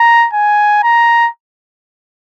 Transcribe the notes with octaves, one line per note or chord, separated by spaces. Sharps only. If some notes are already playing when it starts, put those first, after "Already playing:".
Already playing: A#5
G#5
A#5